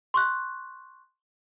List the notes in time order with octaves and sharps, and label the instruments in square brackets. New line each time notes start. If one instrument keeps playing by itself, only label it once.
[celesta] C6 C#6 F#6